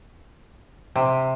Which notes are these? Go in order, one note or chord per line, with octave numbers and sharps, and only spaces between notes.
C3